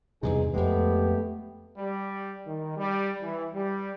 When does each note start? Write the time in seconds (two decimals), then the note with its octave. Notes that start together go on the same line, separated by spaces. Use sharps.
0.23 E2 G2 C3 B3 D#4 G#4
0.54 F2 G#3 A3 B3 G4
1.77 G3
2.46 D#3
2.77 G3
3.22 E3
3.53 G3